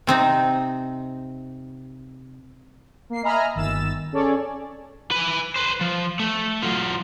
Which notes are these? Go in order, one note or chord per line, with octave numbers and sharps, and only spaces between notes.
C3 C4 D#4
A#3 C7
D#5 E5 G#5 A#5 B5 F6
G1 D#3 E6 A6 E7
C#4 G#4 A4 C#5 D5
B4 G#5
B4 C5
F3
A3
F#3 F4